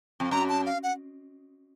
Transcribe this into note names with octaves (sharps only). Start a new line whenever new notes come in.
F2
F#2 A#5
A5
F5
F#5